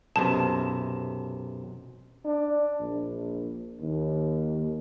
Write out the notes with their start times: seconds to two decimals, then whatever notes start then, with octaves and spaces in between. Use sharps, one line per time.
0.16 B1 F#2 C3 A5
2.25 D4
2.80 A#1
3.81 D#2